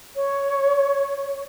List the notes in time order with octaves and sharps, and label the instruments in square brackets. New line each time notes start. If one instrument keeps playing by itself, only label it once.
[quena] C#5